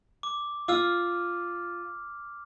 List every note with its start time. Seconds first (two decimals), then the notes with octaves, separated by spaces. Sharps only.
0.23 D6
0.68 F4 D6 E6 F6